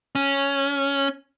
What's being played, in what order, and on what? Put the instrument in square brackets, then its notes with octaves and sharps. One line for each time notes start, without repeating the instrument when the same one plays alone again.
[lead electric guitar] C#4